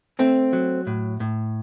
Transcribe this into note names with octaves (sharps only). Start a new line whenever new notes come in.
A3 C4
F#3
A2
A2